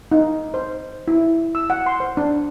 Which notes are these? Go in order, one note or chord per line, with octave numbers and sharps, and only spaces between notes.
D#4
C5
E4
E6
F#5
C6
C5
D4